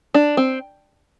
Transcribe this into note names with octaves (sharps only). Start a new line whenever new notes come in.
D4
C4